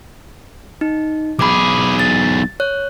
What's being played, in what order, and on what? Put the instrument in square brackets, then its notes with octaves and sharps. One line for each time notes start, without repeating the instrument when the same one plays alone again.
[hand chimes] D#4
[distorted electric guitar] B1 G#4 [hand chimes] B5 D6
[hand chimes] A6
C#5 F#6